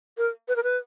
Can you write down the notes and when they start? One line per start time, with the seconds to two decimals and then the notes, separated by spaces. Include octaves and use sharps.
0.17 A#4
0.48 B4
0.56 A#4
0.63 B4